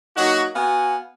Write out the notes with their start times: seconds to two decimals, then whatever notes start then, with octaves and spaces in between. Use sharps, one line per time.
0.17 F#3 A#3 D#4 F#4
0.55 B3 F#4 F5 G#5